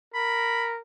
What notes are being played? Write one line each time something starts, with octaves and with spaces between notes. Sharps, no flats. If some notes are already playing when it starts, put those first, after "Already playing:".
A#4 B5